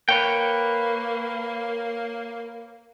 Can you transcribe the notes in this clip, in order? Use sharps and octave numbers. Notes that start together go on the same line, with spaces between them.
A#3 B4 C#5 G5